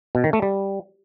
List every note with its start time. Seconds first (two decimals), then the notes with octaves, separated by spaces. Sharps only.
0.15 B2
0.24 D#3
0.33 A3
0.42 G3